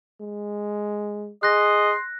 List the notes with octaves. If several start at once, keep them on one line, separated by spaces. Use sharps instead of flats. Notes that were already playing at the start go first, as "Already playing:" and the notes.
G#3
G#4 D#5 C6 F#6 A#6